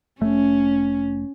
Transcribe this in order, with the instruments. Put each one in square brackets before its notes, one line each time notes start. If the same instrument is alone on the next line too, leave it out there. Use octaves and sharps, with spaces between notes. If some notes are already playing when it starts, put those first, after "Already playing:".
[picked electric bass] F1 A3 [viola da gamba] C#4